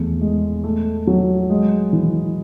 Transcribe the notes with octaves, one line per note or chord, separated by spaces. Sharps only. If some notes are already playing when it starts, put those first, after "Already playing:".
Already playing: E2 A3
G#3
A3
F#3
G#3
E3